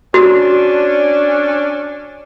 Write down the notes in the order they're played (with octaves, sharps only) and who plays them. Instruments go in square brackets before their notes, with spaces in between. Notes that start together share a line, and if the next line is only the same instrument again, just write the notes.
[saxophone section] C#4 D4 [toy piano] F#4